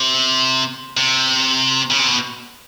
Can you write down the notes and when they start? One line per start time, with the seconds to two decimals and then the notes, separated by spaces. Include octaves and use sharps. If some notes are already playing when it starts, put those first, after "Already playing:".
Already playing: C3
0.97 C3
1.91 C#3
1.99 C3
2.08 B2